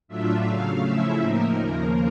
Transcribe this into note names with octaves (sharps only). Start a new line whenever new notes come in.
A2 F#3 A3 D4 F4 E5
C#3 F#3 A3 F5
C#3 F3 A3 C#4 E4 E5
A2 F3 A#3 D#4 A#4
D#2 C#3 F3 A#3 A#4